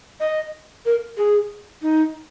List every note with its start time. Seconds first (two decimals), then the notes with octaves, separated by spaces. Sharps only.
0.20 D#5
0.85 A#4
1.17 G#4
1.82 D#4